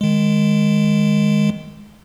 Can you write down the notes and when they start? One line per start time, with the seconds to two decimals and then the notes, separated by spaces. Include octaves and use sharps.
0.01 D#3 G#3